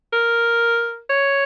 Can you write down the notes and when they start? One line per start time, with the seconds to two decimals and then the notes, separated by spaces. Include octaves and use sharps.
0.13 A#4
1.10 C#5